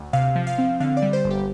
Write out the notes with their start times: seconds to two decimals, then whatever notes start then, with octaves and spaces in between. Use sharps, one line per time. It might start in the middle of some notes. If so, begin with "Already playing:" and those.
Already playing: D2
0.13 C3 F5
0.35 F3
0.47 F5
0.58 C4
0.80 D3 F5
0.97 D5
1.02 G3
1.13 C5
1.25 G1
1.30 G4